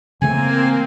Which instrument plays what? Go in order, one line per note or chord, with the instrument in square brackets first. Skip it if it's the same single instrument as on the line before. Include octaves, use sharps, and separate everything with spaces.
[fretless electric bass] C#3 E3 A3 [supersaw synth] A#3 C4 [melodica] G#5